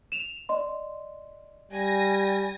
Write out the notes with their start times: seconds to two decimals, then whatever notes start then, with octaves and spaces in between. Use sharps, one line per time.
0.12 E7 F7
0.49 D5 D#5 C6
1.72 G3 G#5 A#6